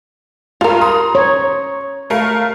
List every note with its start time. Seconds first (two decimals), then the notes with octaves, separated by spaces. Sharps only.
0.61 G2 F4 A#4
0.81 A#5 C6 D#6
1.15 C#5
2.10 A3 A#4 F5